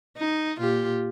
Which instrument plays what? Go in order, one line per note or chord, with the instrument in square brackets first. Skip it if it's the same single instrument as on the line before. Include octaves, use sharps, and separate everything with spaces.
[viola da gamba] D#4
A#2 F4 G4